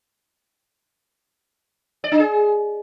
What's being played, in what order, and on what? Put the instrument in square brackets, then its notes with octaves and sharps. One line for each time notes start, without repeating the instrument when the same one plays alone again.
[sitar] D5
D4
G#4